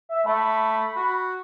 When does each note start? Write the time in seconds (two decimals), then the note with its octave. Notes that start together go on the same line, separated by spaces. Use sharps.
0.09 E5
0.26 A3 B5
0.96 F#4